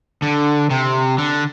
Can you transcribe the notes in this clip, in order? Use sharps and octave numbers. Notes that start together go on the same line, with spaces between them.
D3
C3
D3